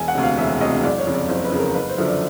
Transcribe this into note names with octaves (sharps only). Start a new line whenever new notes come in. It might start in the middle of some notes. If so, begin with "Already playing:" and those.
Already playing: E1 G#5
F#5
D2 C3
F5
E1 E5
D2 C3 D#5
F#1 D5
C#5
F2 C#3
D5
F#1 C5
B4
F2 C#3
A#4
F#1 B4
C5
F#2 D3 F3
D5